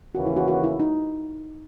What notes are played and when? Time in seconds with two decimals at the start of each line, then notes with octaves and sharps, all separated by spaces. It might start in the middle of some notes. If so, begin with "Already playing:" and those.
0.15 D#2 C#3 E3 A#3 C#4 F#4
0.26 E4
0.36 F#4
0.48 F#4
0.64 E4
0.80 D#4